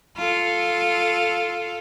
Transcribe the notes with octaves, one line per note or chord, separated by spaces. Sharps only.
F4 A4